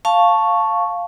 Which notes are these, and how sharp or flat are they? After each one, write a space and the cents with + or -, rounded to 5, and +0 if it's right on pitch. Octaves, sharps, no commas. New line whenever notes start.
F5 +0 A5 +0 C#6 +0